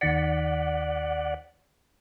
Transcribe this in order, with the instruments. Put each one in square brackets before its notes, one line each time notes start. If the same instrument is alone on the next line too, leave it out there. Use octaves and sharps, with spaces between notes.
[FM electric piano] D#2 D#3 B6 [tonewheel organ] D5 F#5